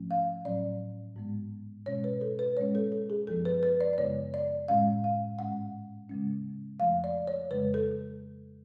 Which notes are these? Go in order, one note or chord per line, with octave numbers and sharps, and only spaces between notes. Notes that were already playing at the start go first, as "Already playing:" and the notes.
Already playing: G#2 F3 A3 C#4
F5
A2 F#3 C#4 D5
G#2 G#3 B3
B2 G#3 C#4 C#5
B4
A4
B4
G#2 G#3 C#4 C#5
A4
A4
G#4
F#2 F3 B3 A4
B4
B4
D5
D5
F#2 C#3 G#3 B3 C#5
D5
A2 G#3 C#4 F5
F5
G#2 G#3 C#4 F#5
C#3 G#3 C#4
F2 F3 A3 F5
D5
C#5
F2 C#3 G#3 B4
A4